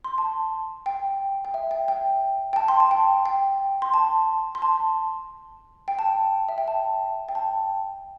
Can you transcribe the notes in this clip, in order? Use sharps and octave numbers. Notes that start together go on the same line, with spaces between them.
C6
A5
G5
G5
E5
G5
G5
G5
A5
C6
A5
G5
G5
C6
A5
C6
A5
G5
A5
E5
G5
A5
G5
A5